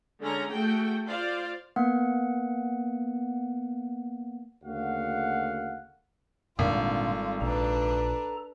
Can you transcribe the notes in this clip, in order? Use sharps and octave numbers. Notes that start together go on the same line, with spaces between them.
D3 G#3 C#4 A#5
A3 F#4 G#4 G5
F4 C5 D5 F5
A#3 B3 F#5
D2 C#3 A#3 F#4 F5 F#5
G#1 A#2 D3 G3 C4 F4 A4
A#1 D4 A4 B4 A#5